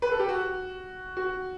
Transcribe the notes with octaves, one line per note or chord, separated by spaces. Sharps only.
B4
A4
G4
F#4
F#4